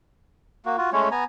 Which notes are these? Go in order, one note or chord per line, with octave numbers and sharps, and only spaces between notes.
A#3 F#4
F4 F#4
G#3 A3 C#4 C#5
B3 G#5 A#5